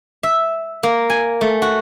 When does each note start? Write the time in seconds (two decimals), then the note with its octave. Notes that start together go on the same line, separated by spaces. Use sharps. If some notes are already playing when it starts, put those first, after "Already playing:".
0.23 E5
0.83 A#3
1.10 G#5
1.41 A3
1.62 F#4